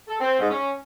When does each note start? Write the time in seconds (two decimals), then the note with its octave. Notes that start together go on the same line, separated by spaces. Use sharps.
0.08 A4
0.20 C4
0.39 G#2
0.51 C#4